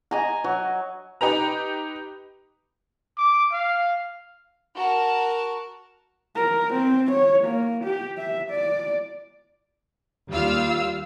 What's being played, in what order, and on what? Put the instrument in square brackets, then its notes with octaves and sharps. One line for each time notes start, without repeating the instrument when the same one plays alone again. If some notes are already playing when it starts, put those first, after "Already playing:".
[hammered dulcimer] D#5 G#5 A#5
F#3
[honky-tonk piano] D#4 G4 B4 A#5
[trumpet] D6
F5
[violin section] F#4 A#4 A5
[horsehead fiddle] A#4
C4
C#5
A#3
G4
E5
D5
[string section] D#2 G3 F4 F5 E6